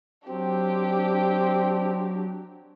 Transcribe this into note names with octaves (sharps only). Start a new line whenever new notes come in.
F#3 C4 D4 G4